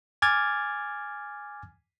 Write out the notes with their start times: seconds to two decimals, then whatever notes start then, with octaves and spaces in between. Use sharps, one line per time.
0.22 G#5 D6 F6 G#6 A6